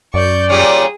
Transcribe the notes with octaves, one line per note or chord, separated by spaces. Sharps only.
F#2 D5 C#6 G6
A#2 G3 C#4 G#4 D#6